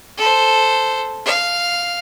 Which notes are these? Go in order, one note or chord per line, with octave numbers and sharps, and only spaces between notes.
A4 C5
F5